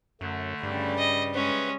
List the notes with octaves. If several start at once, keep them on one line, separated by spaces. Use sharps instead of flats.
F#2 D3 A3
G2 C#3 G3
D#5
G#3 C#4 B4 E5